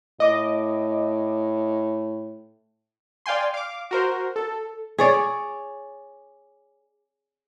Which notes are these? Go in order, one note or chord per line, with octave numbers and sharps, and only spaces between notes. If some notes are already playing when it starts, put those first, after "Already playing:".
A2 D#5 D6
D5 F5 G5 G#5 C6
F5 D6
F#4 A#4 C5
A4
G#4 C#5 D5